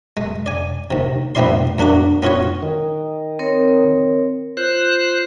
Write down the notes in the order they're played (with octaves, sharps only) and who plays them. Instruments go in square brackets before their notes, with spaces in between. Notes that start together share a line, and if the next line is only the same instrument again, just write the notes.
[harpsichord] G#3
D5 G#5
D#2 C3
A1 B3 C4 E4 D5 C6
E2 A#3 D4 F#4 D6
B3 C#4 F4 F#4 C#5
[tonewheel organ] D#3
[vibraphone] C4 A#4 C#5
[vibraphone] F4 [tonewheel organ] C5 F#6